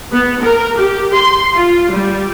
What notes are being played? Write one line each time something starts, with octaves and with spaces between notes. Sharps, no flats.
B3
A#4
G4
C6
F4
G3